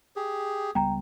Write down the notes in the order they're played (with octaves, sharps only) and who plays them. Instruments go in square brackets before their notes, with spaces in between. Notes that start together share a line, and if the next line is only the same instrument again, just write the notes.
[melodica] G4 G#4
[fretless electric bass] C#2 G3 B3 [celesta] G5 A#5